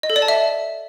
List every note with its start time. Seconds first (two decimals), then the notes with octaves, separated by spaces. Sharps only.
0.03 D#5
0.10 A4
0.16 D5
0.22 A5
0.28 E5